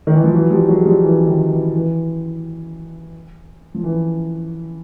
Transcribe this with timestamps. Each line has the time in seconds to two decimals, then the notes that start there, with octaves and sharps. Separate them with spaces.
0.07 D#3
0.15 E3
0.24 F3
0.34 E3 F#3
0.50 F3 G3
0.68 F#3 G#3
0.85 F3 G3
1.03 E3
1.27 D#3
1.50 E3
1.73 E3
3.74 F3
3.84 E3